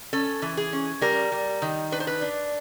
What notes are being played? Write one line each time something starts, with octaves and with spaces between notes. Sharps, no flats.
C#4 A4
E3
G#4
C#4
G3 A#4
G3
D#3
D4 B4
C5
B4
D4